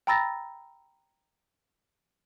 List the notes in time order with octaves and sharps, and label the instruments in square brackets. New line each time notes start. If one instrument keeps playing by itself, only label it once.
[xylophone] G5 A#5 B5 E6 A6 A#6